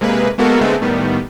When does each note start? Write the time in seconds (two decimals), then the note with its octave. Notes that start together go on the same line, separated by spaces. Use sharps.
0.01 C3 G#3 A#3 G#4 B4
0.38 G#3 A#3 B3 F#4 A4 A#4
0.61 D3 G#3 A3 B3 C4
0.81 A2 D#3 G3 B3